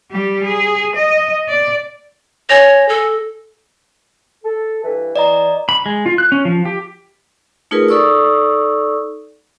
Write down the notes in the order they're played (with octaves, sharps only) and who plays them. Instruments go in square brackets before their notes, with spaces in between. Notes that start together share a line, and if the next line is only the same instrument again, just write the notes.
[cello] G3 G4
G#4
D#5
D5
[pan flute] C#5 [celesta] G#5 A#6
[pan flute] A4
[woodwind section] A4
G2 E3 B4
[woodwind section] E3 [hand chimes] D5 D#5 A#5
[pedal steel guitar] B5
G#3
F4
F#6
C#4
F3
G4
[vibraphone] A3 D#4 F4 G#4 A#4 B4
D#4 A4 D5 C#6 D#6 E6